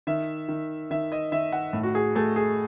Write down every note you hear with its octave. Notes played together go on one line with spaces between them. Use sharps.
D#3 E5
D#3
D#3 E5
D#5
D#3 E5
F#5
A2
F#4
G#4
A3 G#4
G#4